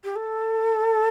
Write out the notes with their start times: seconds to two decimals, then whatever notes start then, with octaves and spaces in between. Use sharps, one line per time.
0.04 G4
0.16 A4